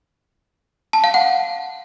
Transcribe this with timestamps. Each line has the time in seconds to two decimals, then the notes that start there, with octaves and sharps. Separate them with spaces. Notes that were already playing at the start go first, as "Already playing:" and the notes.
0.93 A5
1.04 F5
1.14 F#5